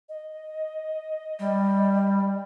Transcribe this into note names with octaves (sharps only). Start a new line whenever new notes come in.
D#5
G3